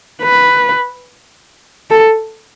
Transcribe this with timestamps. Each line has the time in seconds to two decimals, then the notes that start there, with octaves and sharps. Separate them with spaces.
0.22 B4
1.91 A4